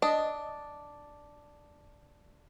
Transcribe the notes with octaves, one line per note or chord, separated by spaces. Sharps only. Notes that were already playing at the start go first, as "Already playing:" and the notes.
D4 D#5